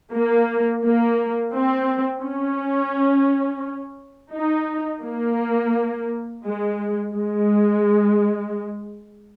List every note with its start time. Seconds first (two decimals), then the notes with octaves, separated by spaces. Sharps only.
0.13 A#3
0.84 A#3
1.54 C4
2.23 C#4
4.34 D#4
5.04 A#3
6.44 G#3
7.15 G#3